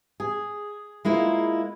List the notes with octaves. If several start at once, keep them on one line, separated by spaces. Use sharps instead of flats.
G#4
G#3 A#3 E4 F4